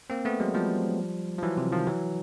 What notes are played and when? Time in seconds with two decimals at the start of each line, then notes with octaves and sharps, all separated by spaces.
0.10 A#3 C4
0.25 A3 B3
0.40 F#3 G#3
0.54 F3 G3
1.38 F3
1.43 E3 F#3
1.57 C3
1.72 D#3 F3
1.87 E3 F#3